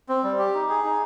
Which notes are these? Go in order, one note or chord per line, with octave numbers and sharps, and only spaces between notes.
C4
G3
G4
D#4
G#4
D#4